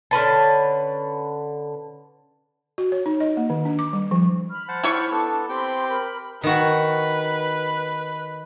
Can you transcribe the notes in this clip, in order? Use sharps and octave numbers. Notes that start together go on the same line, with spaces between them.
D3 C#4 B4 A5
F#4
C#5
D#4
D#5
A#3
D#3
D4
D6
G3
F3
B5 F6
C5 F#5 A5
E4 C#5 C#6
B3 D4 A4 A5 D6
C4 G4 G5 B5 C6
A#4 B5
D#3 F#4 B4